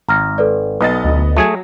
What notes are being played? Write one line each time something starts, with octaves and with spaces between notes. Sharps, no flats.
G#1 A#5 F6 A#6
A4 B4 D5
B1 B3 D#5 A6
D2
F#3 A3 G#4 G#5